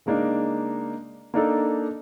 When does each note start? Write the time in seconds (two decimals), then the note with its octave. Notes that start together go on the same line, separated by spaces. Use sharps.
0.06 C#3 G#3 A#3 D4 D#4
1.34 A#3 D4 D#4 A4